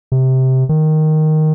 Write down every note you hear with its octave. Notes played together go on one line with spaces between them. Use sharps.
C3
D#3